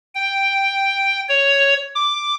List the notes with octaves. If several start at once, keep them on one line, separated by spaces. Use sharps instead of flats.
G5
C#5
D6